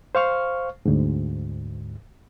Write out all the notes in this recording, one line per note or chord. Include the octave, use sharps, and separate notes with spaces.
C5 F5 C#6 F6
D2 G#2